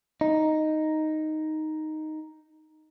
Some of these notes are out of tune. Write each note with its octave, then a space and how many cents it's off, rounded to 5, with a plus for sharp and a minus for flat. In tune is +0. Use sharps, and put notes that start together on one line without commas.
D#4 +0